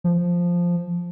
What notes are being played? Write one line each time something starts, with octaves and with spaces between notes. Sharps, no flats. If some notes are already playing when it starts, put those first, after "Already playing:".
F3